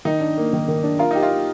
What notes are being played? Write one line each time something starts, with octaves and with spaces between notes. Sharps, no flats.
D#3 D#4
D4
A#3
D#3
D#3
D4
F4 A#4
D#4 G4
F4
D#4